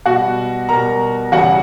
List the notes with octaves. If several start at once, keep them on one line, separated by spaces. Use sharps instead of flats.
B2 G3 F#4 F#5
B2 G3 A#4 A#5
E2 C#3 E3 G3 F#4 F#5